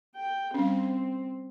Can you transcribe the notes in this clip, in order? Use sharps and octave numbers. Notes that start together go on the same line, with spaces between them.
G5
G3 C4 C#4